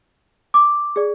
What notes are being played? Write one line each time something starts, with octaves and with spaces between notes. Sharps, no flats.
D6
G#4 D5